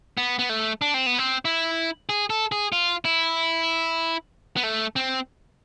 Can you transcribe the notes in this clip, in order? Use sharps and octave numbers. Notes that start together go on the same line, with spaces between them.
B3
B3
A3
D4
C4
B3
C4
E4
G#4
A4
G#4
F4
E4
B3
A3
C4